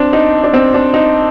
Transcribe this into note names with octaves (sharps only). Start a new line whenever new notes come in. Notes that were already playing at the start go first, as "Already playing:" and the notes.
Already playing: C4 D4
D#4
D4
C4
D4
D#4